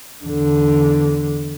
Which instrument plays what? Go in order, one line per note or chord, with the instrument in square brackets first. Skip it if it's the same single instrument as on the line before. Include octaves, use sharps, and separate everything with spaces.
[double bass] E2 D3